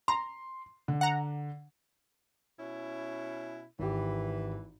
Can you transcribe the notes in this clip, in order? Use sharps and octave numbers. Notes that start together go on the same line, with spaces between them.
A#5 C6
D3
F#5 A#5
B2 C#4 E4
G#1 E3 G4